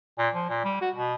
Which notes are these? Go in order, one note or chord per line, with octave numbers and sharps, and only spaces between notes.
A#2
F3
A#2
G3
F#4
B2